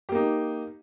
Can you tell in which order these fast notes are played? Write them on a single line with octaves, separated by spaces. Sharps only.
G4 A#3 D#4